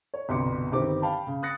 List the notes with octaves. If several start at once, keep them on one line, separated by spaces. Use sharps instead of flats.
C#5
G1 C2 B2 C6 D6 C#7
G1 D#3 C4 G4 D6
F5 G5 A5 B5
C#3
D#6 F#6 A6 A#6 C#7